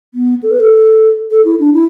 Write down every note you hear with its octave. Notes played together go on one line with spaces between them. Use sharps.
B3
A4
B4
A4
A4
E4
D4
E4